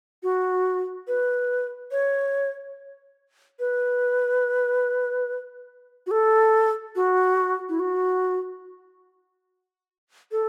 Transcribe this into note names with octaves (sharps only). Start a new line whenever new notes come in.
F#4
B4
C#5
B4
F#4
A4
F#4
E4
F#4
A4